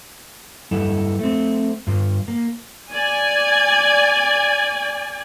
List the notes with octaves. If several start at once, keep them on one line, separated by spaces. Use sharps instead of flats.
G2 G3 E4 A4
A3 C4
G2 F4
A#3
D5 G#5